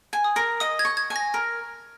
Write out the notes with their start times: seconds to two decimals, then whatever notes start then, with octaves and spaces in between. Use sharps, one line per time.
0.13 G#5
0.24 D#6
0.36 A#4
0.60 D#5 D#6
0.79 G#6
0.85 C#6
0.97 G#6
1.10 G#5
1.16 A#6
1.34 A#4 A#6